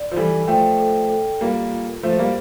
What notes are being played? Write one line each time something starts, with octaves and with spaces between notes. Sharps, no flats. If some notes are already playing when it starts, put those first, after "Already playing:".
Already playing: D5
F3
E3 G3 A4
F3 A3 G5
A4
A4
G3 A#3 F4
F4
F3 A3 C5
G3 A#3